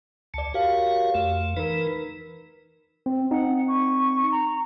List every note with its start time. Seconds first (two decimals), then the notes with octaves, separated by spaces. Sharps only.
0.34 D2 D5 A5 C#7
0.54 F#4 G4 A#4 C#5 F5
1.15 F2 A3
1.57 E3 D#4 A#4 B4
3.06 C4
3.31 C4 D#4 F#5
3.68 C#6
4.31 A#5